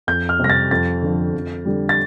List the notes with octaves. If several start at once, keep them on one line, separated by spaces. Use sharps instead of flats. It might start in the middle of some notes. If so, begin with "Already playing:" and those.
F2 G6
F6
C3 G3 A#6
A6
F2 A6
D3 F3
F2
D3 G3
A6